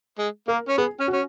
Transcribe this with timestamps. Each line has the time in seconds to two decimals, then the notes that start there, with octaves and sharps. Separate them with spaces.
0.19 G#3
0.48 A#3 A#4
0.68 C#4
0.78 B3 G#4
1.00 C#4
1.08 F#4
1.13 C#4